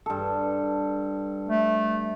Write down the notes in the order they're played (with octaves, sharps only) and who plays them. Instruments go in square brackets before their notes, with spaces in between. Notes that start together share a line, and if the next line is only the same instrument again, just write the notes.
[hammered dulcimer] G2 A4
[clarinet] A3